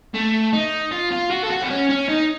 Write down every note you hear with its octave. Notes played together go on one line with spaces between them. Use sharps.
A3
D#4
F4
F4
F#4
A4
F#4
C4
C#4
C#4
D#4